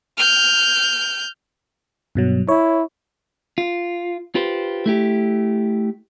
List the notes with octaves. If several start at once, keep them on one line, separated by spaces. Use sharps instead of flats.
F6 G6
G2 B2 F#3
E4 C#5
F4
F4 G4 B4 C5
A3 E4 G4